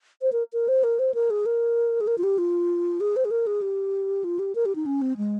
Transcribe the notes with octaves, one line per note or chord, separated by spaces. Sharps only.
C5
A#4
A#4
C5
A#4
C5
A#4
G#4
A#4
G#4
A#4
F4
G4
F4
G#4
C5
G#4
A#4
G#4
G4
F4
G4
A#4
G4
D#4
C#4
C4
G#3